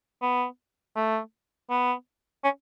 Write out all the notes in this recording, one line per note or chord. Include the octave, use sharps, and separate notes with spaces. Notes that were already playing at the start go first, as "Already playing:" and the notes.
B3
A3
B3
C#4